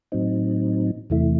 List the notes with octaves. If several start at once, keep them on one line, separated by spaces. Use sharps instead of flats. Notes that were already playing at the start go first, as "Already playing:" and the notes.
A2 F#3 C4 D#4
E2 C3 E3 A3 E4